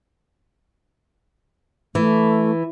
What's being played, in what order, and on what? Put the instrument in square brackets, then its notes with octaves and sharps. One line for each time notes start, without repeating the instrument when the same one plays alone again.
[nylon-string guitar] E3 [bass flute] A3